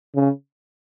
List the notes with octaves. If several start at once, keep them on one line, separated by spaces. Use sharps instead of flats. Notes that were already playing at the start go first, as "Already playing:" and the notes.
C#3